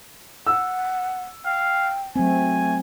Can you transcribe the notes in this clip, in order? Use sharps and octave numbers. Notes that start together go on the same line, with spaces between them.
F#5 E6
F5 G5
F#3 A3 C4 G#5